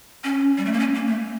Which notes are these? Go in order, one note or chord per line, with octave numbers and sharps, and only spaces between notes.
C#4
G3
A3
A#3
C#4
A#3
A3